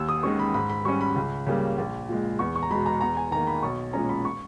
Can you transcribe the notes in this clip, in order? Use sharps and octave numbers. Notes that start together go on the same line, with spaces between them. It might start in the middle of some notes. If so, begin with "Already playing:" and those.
Already playing: D#2 E6
D#6
D#3 G#3 C#4 C#6
B5
G#2 B5
B5
G3 C#4 C#6
B5
C#2
C#3 G3 A#3
A#1
A#2 G#3
E2 C#6
C#6
A#5
B2 G#3 B5
A#5
E2 A#5
G#5
D#3 A#3 A#5
B5
B1 C#6
A#2 G#3 C#4 A#5
B5
C#6